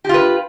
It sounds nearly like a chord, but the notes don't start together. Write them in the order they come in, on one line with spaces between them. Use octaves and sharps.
G4 F4 B4